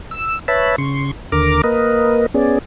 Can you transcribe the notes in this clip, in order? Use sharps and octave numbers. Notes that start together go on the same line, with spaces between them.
E6
B4 C#5 E5 A5 B5
C#3 C6 C#6
D#2 D3 A#4 A#5 D6
A#3 A#4 B4 D#5
B3 C#4 G#4 D5